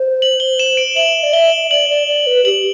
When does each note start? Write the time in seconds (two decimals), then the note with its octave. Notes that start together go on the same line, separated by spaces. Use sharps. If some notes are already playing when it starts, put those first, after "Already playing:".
Already playing: C5
0.22 F#7
0.40 G7
0.59 E7
0.77 D7
0.96 E5 F#7
1.23 D5
1.33 E5 G7
1.71 D5 F#7
1.90 D5
2.08 D5
2.27 B4
2.45 G4 F#7